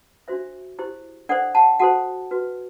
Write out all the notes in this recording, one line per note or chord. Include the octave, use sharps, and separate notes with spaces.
D4 F#4 C5 E5
E4 G4 C5
D4 A4 C5 D5 F#5
F#5 A5
F#4 A4 C5 F#5 A5
F#4 B4